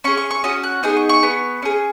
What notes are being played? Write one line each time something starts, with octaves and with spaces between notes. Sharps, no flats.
C#4 G#4 C#6
C#6
C#6
C#4 F#4 D#6
F#6
B3 D#4 G#4 D#6
C#6
C#6
B3 G#4
C#4 G#4